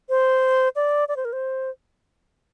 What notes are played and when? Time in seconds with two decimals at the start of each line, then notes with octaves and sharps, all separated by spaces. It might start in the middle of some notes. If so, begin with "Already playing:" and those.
0.09 C5
0.76 D5
1.09 D5
1.17 C5
1.25 A#4
1.33 C5